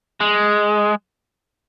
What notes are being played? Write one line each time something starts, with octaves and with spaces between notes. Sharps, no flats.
G#3